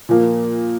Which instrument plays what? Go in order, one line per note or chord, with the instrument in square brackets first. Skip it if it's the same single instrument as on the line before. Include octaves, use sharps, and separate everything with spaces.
[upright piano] A#2 F3 A#3